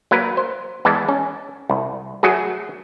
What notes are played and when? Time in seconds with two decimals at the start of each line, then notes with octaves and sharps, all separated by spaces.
0.11 F#3 A#3 A#4 B4
0.37 C5
0.85 E2 E3 G#3 A5
1.09 C#4
1.70 C2
2.23 F#3 A3 F#4 G#4